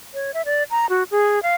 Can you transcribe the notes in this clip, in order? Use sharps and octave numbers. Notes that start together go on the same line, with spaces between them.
C#5
E5
D5
A#5
F#4
G#4
F5